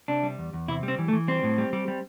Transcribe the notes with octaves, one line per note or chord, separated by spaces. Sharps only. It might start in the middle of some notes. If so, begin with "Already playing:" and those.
C3 D4
G3
E2
E2
C3 E4
G3
C4
E3
A3
E3
G3 C4
A2
G3
G3
G3